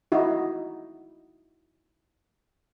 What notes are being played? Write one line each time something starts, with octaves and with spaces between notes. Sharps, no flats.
D#4 E4 F#4